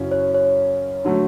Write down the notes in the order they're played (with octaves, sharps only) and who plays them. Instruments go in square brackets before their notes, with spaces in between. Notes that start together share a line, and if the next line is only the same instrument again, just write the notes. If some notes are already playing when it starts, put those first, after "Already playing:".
Already playing: [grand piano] F#2 C#3 F#3 C#4 E4
[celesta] C#5
C#5
[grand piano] D3 F#3 A3